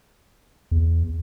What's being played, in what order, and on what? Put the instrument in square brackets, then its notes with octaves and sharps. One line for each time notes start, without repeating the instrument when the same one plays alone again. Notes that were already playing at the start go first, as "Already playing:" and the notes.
[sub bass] E2